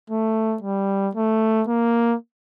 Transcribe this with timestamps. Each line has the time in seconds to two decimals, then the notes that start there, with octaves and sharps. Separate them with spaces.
0.10 A3
0.63 G3
1.15 A3
1.68 A#3